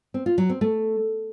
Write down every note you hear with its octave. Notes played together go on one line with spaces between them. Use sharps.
C4
F4
F#3
C4
A3